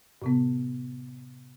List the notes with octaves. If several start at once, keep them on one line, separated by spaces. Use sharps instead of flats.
A2 C3 B3